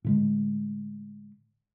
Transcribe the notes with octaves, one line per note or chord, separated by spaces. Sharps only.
A2 D3 G#3